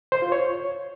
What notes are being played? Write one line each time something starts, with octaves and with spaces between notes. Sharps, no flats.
C5
F4
C#5